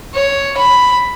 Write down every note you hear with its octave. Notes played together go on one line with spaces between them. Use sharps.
C#5
B5